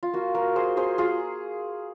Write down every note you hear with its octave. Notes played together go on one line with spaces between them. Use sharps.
F4
A#3 F4 F#4
F#4 A#4
G#4 C5
G#4 C5
A#3 F4 G#4